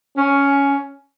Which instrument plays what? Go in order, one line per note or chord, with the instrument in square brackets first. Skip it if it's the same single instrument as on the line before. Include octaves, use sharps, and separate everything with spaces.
[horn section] C#4